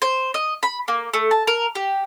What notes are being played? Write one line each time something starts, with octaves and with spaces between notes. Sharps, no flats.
C5
D#5
B5
A#3
A3
A5
A#4
G4